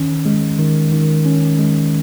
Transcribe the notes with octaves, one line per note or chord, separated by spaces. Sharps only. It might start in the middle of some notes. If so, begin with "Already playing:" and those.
Already playing: D#3 C#4
G#3
D#3
D#3
C#4
G#3